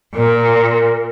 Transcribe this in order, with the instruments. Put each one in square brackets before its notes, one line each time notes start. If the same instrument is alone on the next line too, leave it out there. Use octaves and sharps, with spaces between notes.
[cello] A#2 [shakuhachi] A#4